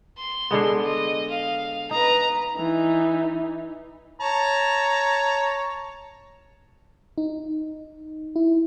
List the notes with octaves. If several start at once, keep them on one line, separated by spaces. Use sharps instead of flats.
C6
D3 G#3 B3
D#5
F5
D#4 B4 A#5
E3 D#4
C#5 A5 A#5
D#4
E4